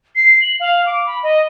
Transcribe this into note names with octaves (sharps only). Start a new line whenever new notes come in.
C7
F#7
F5
D6
B5
D#5